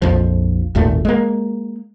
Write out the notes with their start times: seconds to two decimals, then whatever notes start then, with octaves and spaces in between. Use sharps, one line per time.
0.02 A#1 F2 F3
0.75 G#1 D#2 A#2 A3
1.05 G#3 A#3